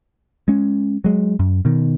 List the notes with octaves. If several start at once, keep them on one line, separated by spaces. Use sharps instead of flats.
G#3 C#4
F#3 G#3
F#2
B2 D#3